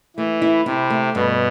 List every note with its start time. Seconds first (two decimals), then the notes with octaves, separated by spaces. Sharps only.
0.17 E3 A3
0.42 E4
0.66 C3 E4
0.90 A3
1.14 G2 B2